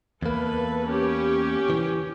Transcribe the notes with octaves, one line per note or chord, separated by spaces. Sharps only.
E2 A#3 A4 B4
C#4 G4
E3